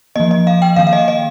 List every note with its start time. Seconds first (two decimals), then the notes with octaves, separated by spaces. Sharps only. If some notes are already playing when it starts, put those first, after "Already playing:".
0.16 F3 A#3 D#5
0.31 D#5
0.47 F5
0.62 G5
0.76 D#3 A#3 F5
0.87 F5
0.93 D#5
1.08 D#5